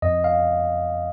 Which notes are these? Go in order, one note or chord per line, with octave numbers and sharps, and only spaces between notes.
F2 D#5
F5